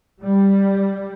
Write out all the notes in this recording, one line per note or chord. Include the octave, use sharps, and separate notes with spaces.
G3